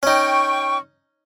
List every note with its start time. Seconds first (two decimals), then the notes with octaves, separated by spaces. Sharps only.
0.03 C#4 D#4 G5 C#6